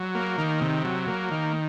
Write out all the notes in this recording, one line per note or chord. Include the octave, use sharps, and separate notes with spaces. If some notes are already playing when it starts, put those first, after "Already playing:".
Already playing: F#3
A#3
D#3
C3
F#3
A#3
D#3